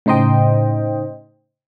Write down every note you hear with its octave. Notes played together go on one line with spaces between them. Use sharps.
A2 C#3 D#4 C5 D#5 G5